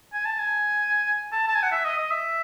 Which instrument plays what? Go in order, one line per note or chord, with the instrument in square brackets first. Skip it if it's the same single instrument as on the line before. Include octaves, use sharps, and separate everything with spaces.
[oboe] G#5
A5
G#5
A5
A5
G#5
F#5
E5
D#5
D#5
E5